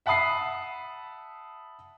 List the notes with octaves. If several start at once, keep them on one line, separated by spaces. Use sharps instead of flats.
E5 F#5 A5 B5 D#6 C7